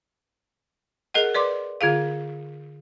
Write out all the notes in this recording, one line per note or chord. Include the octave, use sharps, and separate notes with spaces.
G#4 A#4 D#5 F#5
B4 D5 C6 D6
D3 F4 G#4 F5